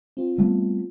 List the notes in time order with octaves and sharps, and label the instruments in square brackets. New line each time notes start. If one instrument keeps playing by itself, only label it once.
[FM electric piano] C4 F4
[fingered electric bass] G3 A3 B3